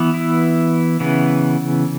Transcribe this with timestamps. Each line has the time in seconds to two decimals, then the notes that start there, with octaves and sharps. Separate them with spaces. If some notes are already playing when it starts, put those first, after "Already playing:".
Already playing: E3 B3
0.14 E4
1.00 C#3 E3 B3